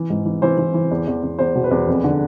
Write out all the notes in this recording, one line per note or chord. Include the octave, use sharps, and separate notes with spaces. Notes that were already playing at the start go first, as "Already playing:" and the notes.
Already playing: E3
G#2
E3
E3 C5
E3
E3
E2
E2
E2
E2 C5
B2
B4
E2
F2
D3